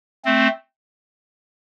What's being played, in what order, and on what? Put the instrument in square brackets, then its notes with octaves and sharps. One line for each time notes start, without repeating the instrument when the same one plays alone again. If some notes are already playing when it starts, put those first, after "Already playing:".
[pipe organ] A3 C4